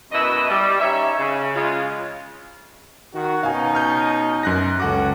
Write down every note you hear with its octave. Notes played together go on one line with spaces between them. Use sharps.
F#2 B2 B3 E4 D#5
G3
C#4 D#4 C#5 E5
C#3
C#3 G#3 F4
D#3 F#4
B2 C#4 D#4 F5 G#5
F6 G6
F#2 F#6 A#6
C#2 C#4 F#4 A4 F#5 D6